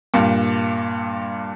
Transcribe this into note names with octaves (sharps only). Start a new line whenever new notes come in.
G2 A#2